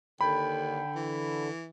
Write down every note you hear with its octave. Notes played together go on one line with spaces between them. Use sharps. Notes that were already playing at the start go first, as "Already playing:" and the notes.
D#2 D3 G5 B5
E3